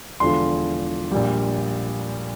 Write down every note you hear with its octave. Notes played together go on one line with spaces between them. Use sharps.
E1 E2 D3 F3 C6
A#1 A#2 G3